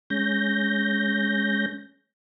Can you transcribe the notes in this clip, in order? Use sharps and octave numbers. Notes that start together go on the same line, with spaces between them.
G#3 C#4 G6 A#6